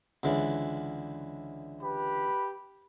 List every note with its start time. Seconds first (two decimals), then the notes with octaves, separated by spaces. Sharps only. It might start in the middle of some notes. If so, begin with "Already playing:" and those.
0.23 C#2 D3 E3
1.82 G4 B4 B5